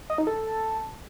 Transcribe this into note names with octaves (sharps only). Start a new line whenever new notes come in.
D#5
D#4
A4